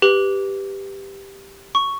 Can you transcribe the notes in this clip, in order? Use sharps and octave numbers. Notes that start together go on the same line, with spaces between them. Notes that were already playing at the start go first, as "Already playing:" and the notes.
G4 B4 F#7
C#6